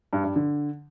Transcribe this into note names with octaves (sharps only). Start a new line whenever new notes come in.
G2
G2
D3